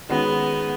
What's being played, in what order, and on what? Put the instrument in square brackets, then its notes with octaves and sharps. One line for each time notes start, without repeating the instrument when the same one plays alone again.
[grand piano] D#3 G#3 C#4 F#4 [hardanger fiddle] B3